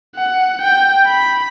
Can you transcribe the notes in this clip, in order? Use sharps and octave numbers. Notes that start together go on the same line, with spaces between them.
F#5
G5
B5